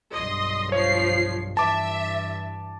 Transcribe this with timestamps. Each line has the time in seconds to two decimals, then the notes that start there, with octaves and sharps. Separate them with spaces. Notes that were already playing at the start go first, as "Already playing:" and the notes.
0.14 B1 G2 D#5 C6
0.72 F3 C#5 C7
1.57 G2 E3 E5 A5 D6